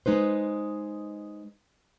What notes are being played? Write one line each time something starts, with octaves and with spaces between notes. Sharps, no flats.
G#3 D#4 B4 C5